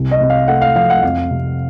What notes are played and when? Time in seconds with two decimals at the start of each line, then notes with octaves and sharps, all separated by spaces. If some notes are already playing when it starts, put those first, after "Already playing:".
Already playing: C2
0.11 D#5
0.21 C3
0.30 F5
0.48 A3 F#5
0.62 F5
0.75 F3 F5
0.90 F#5
1.03 F2 F5
1.31 C3